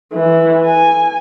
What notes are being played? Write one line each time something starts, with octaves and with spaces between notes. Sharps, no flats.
E3
G#5